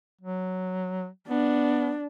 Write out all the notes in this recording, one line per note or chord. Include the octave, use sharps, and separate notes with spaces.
F#3
B3 D4